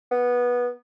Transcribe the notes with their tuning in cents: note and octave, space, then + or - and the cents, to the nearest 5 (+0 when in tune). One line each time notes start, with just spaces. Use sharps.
B3 -15